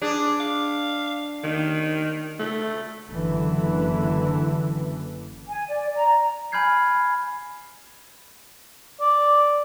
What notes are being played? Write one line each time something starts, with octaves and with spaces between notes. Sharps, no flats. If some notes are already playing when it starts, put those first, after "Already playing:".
D4 G#4
F5
D#3
A3
F#1 D3 E3
G#5
D5
A#5
G#5 B5 F6 G6 G#6 C7
D5